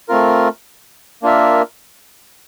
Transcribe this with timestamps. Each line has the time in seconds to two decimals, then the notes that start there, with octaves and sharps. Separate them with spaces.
0.09 A3 C4 F4 A#4
1.23 A#3 D4 F4 A#4 E5